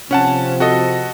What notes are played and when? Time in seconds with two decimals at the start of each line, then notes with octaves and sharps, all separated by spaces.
0.11 C3 F3 C4 C#4 F#5 A5
0.60 F#4 A4 D#5